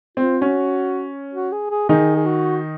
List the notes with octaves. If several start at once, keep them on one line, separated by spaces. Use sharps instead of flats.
C4 F4
C#4 F#4
F#4
G#4
G#4
D#3 D#4 G#4
G#4
F#4